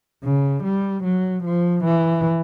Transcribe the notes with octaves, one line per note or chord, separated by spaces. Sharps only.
C#3
G3
F#3
F3
E3